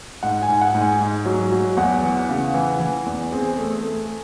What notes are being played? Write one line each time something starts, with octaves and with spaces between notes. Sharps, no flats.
G#2 F#5
G#5
G#2
F#5
G#2
G#5
G#2
F#3
F#3
E2 F#5
E3
C#3
E3
E3
E2
C4 G#4
A3
A3